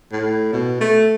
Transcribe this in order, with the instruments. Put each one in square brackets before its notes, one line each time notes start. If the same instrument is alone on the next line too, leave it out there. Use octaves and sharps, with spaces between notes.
[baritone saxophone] A2
B2
A3